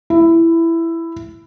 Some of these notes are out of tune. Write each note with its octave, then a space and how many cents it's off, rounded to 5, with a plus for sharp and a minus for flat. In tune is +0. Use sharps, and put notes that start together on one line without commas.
E4 +10